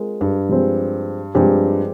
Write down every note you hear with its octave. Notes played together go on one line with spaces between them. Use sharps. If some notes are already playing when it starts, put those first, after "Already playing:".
Already playing: G#3 C4 F4 A#4
G2
F3 G#3 C4 G4
G2 F3 G#3 C4 G4